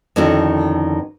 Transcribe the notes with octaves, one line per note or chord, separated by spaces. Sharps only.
F2 D3 D#3 C#4 E4 F#4